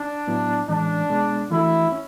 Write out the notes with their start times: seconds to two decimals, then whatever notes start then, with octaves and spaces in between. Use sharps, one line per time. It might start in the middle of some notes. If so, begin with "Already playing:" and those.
Already playing: D4
0.27 A2 F#3 B3 E4
0.68 A2 E3 G#3 C#4 D4
1.09 B2 G#3 B3
1.50 E3 A3 D4 E4 F#4
1.92 C#4